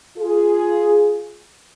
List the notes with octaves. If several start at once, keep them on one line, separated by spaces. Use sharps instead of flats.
F4 G#4